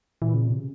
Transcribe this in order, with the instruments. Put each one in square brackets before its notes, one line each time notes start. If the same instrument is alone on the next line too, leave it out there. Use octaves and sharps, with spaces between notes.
[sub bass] A#2 [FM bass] E3
[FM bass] C#3
C3
C#3